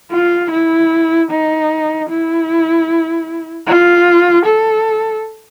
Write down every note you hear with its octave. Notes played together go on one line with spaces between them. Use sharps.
F4
E4
D#4
E4
F4
A4